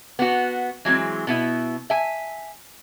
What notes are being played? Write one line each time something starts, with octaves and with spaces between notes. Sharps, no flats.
B3 F#4
E3 F#3 G#3 C4
B2 B3 E4
E5 G#5